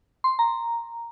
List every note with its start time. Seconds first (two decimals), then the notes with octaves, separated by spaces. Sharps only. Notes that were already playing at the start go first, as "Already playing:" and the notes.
0.24 C6
0.39 A#5